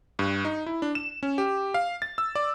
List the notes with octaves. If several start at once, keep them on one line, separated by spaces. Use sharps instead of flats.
G2
D#4
E4
D4
E7
C#4
G4
F5
A6
E6
D5